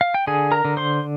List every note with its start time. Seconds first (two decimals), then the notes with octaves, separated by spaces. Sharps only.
0.01 F5
0.14 G5
0.27 D3 G#4 G#5
0.52 A#4 A#5
0.65 D3
0.77 C5 C6